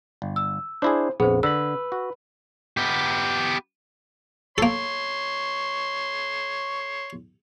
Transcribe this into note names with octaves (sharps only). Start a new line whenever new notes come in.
G1
E6
D4 E4 G#4 C5
A#1 F2 B3 G#4 C5
D3 B4 B5 E6
F#4
B3 G4
A#3 A4 C#5 C6